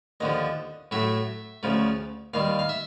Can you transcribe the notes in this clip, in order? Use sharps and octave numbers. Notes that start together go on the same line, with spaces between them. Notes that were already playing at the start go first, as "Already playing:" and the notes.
D#2 D3 F3 D#5
A2 F#3 A3 E5
D2 C#3 F3 A3
D#2 D#3 G3 F5
F5
E5